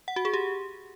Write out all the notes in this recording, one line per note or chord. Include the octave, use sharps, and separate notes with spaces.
F#5
F#4
G#4
G4